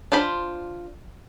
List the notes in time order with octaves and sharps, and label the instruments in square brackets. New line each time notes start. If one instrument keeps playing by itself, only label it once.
[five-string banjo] D4 F4 C5 B5